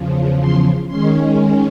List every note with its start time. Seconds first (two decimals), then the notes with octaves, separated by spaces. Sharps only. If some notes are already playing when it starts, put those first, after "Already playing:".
Already playing: E2 C#3 F3
0.40 C6
0.88 D#3 G#3 C#4 C6